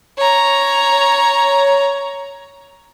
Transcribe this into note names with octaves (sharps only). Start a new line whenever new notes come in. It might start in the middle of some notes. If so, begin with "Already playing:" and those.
C#5 A#5